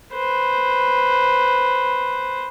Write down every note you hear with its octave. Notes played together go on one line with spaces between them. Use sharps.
B4 C5